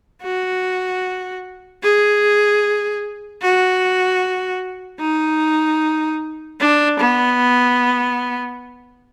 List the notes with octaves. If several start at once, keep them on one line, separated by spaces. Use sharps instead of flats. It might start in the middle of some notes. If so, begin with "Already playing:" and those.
F#4
G#4
F#4
D#4
D4
B3